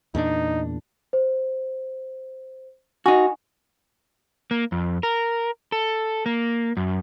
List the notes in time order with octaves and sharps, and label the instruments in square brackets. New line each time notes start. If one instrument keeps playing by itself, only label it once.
[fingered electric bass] E2 A#2 D4 [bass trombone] D#4
[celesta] C5
[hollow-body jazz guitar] D#4 F#4 [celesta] G#5
[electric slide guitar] A#3
F2
A#4
A4
A#3
F#2